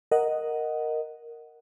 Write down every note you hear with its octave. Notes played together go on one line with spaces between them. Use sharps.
A#4 D#5 F#5